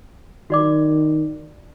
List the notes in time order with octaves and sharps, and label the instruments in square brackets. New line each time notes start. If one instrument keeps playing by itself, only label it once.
[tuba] D#3 [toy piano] F#4 D5 D6